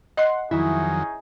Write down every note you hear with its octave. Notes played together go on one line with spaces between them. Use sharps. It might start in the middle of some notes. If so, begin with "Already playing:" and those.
D#5 F#5 C6
F2 D#3 F#3 C#4 D#4 E4 G#4